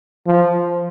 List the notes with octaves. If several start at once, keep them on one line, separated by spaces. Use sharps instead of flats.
F3